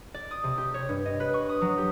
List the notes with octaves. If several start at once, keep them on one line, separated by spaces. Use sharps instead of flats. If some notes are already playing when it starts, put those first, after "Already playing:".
D5
D#6
C3
G4
C#5
G2
D#5
B4
C#6
D#6
F#3
G4